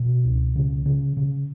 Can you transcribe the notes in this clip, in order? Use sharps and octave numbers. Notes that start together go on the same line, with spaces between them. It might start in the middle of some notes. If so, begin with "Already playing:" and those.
Already playing: B2
C#2
C#3
C#3
C#3